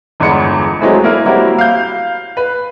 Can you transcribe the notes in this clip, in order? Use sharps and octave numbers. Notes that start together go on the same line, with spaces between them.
G1 E2 G#3 B5 C6 C#7
F#3 G#3 A3 C4 E4 G#4
A#3 E4 A#4
F#3 G3 A#3 C4 E4 F#4
F5 G6
B4